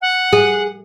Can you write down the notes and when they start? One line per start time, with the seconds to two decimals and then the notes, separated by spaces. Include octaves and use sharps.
0.01 F#5
0.33 G#4